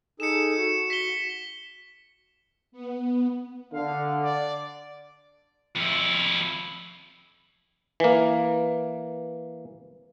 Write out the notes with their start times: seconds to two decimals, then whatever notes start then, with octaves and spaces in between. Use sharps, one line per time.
0.20 D#4 G#4 A4 C#7 E7
0.57 F#4
0.90 B6 G7
2.72 B3
3.73 D3 F5
4.23 D5
5.76 F2 E4
8.00 E3 A#3